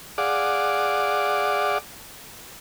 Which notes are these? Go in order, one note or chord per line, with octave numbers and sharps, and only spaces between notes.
G#4 D5 F5 F#5 D6